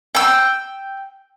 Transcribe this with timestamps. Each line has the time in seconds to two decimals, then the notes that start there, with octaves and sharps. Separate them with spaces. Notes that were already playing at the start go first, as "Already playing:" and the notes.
0.15 G5 E6